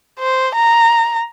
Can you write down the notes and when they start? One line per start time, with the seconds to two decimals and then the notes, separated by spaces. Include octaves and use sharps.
0.19 C5
0.55 A#5